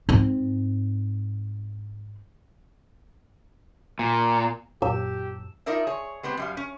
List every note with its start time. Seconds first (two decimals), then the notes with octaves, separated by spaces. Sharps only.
0.09 G#2 C4
3.99 A#2
4.82 F#2 A#2 G4 E6
5.66 D#4 F4 A#4 D5 E5
5.87 G#4 C#5
6.23 G#3 B3 C4 G4
6.37 F#2 G3 F5
6.57 C#4